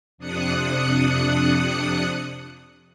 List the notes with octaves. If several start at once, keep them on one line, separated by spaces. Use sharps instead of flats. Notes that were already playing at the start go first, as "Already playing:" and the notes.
F2 C3 D4 D#6 F#6 C#7